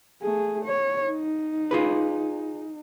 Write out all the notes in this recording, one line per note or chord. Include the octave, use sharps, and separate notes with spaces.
A3 G#4
C#5
D#4
F4 G#4 B4